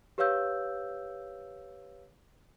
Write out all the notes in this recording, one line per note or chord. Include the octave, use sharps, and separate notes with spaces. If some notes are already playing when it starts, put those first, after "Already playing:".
G4 B4 C#5 F5 E6 G6